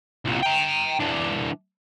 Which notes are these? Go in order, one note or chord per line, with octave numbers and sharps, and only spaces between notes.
C2 A#2
G5 A#5
E3 D4